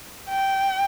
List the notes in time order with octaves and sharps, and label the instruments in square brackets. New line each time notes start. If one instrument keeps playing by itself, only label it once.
[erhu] G5